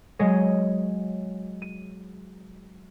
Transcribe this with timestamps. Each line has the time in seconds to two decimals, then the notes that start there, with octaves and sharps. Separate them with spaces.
0.19 F#3 G#3 C#5 D#5
1.62 D#7